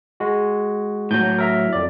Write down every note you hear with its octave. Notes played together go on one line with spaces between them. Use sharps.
G#3 F#4
A2 F#3 G6
A#4 E5 A#5
F2 D5